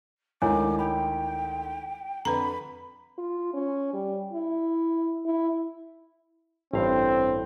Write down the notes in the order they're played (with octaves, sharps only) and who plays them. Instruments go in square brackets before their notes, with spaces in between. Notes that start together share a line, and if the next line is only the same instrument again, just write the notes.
[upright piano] D2 D#3 [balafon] G#3 [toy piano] E4 C#5 G#5 [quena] D6
[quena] G5 [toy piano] B5
[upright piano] F2 D3 [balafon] B4 A#5 [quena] B5
[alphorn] F4
C#4
G3
E4
E4
[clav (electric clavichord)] A1 G2 F5 [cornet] C4